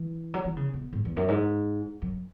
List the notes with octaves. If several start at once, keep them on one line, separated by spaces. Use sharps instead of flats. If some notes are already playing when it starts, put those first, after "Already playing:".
Already playing: E3
F#3
E3
C#3
B2
G#2
E2
F#2
G#2
F#2